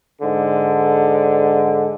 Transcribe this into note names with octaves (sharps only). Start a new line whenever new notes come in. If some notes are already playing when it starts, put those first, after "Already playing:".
G#2 D3